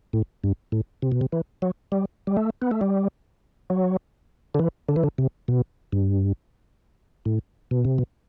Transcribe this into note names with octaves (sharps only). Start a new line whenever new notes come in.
A2
G2
A2
C3
B2
C3
E3
F#3
G3
G3
A3
B3
A3
G3
F#3
D3
E3
D3
E3
D3
C3
B2
G2
A2
B2
C3
B2